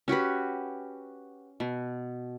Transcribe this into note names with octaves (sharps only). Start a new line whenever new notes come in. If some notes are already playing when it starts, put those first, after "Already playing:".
C#4 F#4 G4 B4
B2